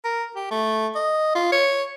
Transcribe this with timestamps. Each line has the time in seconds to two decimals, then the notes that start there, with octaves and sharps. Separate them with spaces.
0.05 A#4
0.36 G4
0.51 A3
0.95 D#5
1.35 F4
1.52 C#5